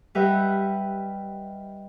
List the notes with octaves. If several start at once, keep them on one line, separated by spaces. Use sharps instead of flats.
G3 G4 B4 D#5 E5 F#5